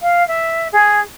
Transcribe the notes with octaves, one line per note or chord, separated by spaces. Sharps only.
F5
E5
G#4